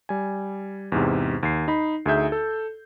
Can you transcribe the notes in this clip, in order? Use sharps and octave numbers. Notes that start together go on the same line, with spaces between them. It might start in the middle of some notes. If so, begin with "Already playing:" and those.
G3 G#5
E2 G#2 C3
D#2 C7
D#4 B5
D2 D#4 G#4 E5 G6
A4